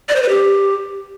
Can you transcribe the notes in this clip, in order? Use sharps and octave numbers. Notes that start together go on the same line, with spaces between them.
D5
C5
B4
G4